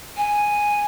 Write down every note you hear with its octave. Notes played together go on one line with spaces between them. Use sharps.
G#5